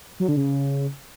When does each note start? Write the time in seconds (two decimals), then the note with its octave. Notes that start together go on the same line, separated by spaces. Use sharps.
0.20 F#3
0.28 D3
0.37 C#3